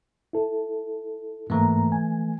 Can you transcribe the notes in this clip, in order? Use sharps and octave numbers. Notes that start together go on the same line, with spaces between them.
E4 A4
G#2 E3 A3 A#3 A#5
G#5